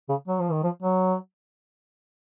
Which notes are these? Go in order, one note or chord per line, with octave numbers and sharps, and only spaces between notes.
C#3
F#3
F3
D#3
F3
F#3